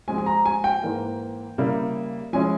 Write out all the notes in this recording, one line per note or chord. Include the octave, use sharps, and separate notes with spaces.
F3 G#3 C4 G#5
G#5
A#5
G#5
G5
G#2 E3 A#3
C#3 G3 A#3 E4
F3 G#3 C#4 E4 G#5